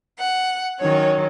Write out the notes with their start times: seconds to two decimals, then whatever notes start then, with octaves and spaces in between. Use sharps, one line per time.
0.19 F#5
0.80 D#3 F#3 C#4 C#5